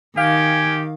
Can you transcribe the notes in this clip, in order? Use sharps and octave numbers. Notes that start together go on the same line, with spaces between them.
D#3 G4 F5 G#5